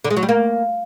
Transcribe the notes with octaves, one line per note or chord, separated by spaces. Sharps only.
D3
G#3
F#3
G3
A#3